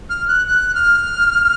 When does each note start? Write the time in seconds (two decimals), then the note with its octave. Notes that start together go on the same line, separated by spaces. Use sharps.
0.10 F6
0.28 F#6
0.47 F#6
0.75 F6